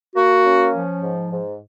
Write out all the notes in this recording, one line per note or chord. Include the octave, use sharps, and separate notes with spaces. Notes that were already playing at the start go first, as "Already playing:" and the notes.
A#3 F#4
C#4
F3
G#2
G#2